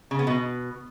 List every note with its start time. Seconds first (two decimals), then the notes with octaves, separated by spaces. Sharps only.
0.11 C#3
0.19 B3
0.27 B2